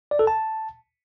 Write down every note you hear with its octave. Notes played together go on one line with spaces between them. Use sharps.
D5
A4
A5